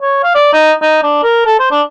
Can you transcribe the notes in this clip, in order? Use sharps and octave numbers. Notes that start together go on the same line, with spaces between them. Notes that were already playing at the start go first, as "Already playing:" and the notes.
C#5
F5
D5
D#4
D#4
D4
A#4
A4
C5
D4